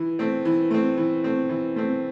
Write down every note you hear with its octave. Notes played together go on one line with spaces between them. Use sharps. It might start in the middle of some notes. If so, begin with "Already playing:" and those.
Already playing: E3
A3 C4
E3
A3 C4
E3
A3 C4
E3
A3 C4